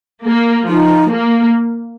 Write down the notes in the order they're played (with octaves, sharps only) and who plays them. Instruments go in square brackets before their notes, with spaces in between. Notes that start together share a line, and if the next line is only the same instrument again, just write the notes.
[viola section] A#3
[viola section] F3 [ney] D#4
[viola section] A#3